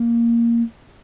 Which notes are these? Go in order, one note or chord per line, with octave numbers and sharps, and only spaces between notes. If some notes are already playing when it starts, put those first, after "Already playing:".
Already playing: A#3